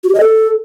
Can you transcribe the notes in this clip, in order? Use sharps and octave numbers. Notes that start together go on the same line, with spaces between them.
F#4
G4
D#5
A4